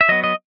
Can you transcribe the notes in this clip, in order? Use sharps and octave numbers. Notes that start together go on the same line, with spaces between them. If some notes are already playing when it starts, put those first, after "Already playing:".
E5
F#3 B3 D#5
D#5